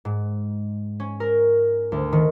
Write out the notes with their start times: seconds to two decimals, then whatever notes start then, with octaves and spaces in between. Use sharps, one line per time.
0.05 G#2
1.00 C#4
1.20 A#4
1.92 D2
2.13 D#3